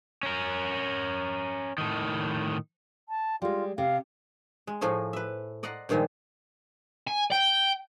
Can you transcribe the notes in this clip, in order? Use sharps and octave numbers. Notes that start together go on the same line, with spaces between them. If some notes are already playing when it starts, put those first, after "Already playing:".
C#4 A#4
A2 D#3
A5
G3 G#3 F4
C3 F5
G#3
A2 F3 A3 G#4 D#5
B4 E5
D5 D#5 F#5 A#5 C6
G2 A#2 D#3 F3 G#3
G#5
G5